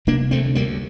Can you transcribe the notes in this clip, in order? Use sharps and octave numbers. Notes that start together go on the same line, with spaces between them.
C3 A#3 D4
D2 A3 C4
D2 G3 A#3